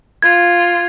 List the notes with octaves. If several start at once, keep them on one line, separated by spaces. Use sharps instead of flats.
F4 G#6